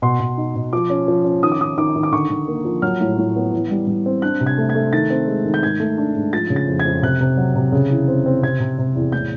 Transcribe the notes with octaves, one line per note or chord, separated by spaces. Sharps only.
B2 C6
B2
D#4
B2
F3 D6
C#4
F3
C#4
D#3 D#6
D6
D#3 D#6
D#3 D6
D#3
D6
D3 C#6
D3
A#3
F3
F#3 F6
A2
A2
B3
E3
G3
G3
C4
D4 F#6
C3
G#6
A3
G#6
A3
D#3 A6
C4
G#3
D#3
G6
G#2 G#6
A3
D4
G#2
F3 A6
C#3
A6
F2
G#6
F2
C3 F#6
C3
F#3
C3
C#3
E3
C4
C4
C3 G#6
C3
C3
E2
A2 G6